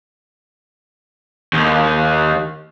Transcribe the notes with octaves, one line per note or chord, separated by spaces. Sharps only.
D#2